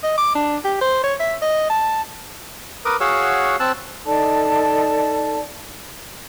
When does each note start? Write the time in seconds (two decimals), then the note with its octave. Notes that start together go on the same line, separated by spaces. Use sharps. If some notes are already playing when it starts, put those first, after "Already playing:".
0.03 D#5
0.17 D6
0.35 D4
0.64 G4
0.81 C5
1.04 C#5
1.20 E5
1.42 D#5
1.70 A5
2.85 A#4 B4 D6 D#6
3.00 F#4 G#4 C#5 F5 F#5 E6
3.60 C4 A5 E6 F#6
4.06 D#4 A4 D5 A5